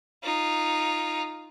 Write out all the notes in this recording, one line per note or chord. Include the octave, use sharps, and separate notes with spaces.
D#4 F4